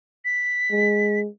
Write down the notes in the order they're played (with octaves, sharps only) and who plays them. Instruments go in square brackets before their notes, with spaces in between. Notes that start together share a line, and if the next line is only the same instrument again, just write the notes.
[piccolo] B6
[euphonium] G#3